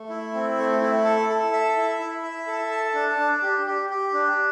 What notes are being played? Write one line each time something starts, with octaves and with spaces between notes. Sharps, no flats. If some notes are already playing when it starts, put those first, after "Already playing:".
Already playing: A3
E4
C4
A3
E4
A4
A4
E5
E4
E4
E5
A4
A5
D4
D4
G4
G4
G4
D4